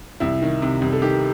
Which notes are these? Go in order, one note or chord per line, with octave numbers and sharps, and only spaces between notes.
C2 E4
D#3
C3
C2
A4
D#3 G4